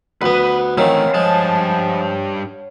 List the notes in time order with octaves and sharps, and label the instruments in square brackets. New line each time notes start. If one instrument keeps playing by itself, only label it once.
[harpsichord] D2 B3 [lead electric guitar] B4 [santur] F#5
[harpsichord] D#3 C4 [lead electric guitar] E3 A3 [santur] C#5 F5
[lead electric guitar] G2 A5 [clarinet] F3 [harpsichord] G#3